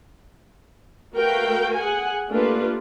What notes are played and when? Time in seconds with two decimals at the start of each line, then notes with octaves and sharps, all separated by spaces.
1.14 A3 F#4 A#4 B4 F5 G5
1.75 G#4 F#5 G#5
2.30 A3 A#3 D4 F4 G4 B4